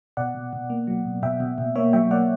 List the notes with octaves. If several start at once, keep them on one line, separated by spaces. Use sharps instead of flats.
B2 D5 F#5
B2
B2
A#3
F#3
B2
B2 E5 G5
B2
B2
A#3 C#5 E5
F#3 E5 G5
A#3 D5 F#5